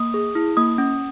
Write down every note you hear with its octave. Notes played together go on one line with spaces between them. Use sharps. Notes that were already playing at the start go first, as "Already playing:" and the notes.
Already playing: A#3 D#6
G#4
E4
A#3 D#6
C#4